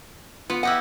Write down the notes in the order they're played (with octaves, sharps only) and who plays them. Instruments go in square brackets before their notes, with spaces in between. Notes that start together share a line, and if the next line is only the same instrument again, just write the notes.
[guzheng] B3 [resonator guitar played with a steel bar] F4
[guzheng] E4 G4 D#5 [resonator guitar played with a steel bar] F#5